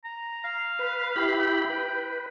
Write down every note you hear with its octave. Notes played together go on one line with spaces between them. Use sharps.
A#5
F5
B4
E4 G4 B5
G5
B4